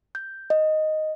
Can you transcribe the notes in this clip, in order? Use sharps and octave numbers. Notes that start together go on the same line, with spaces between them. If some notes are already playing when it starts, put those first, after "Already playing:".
G6
D#5